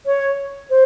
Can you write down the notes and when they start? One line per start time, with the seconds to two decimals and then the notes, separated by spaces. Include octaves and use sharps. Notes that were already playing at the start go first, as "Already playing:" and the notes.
0.06 C#5
0.70 C5